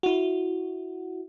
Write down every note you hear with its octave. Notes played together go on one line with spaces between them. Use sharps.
E4 F#4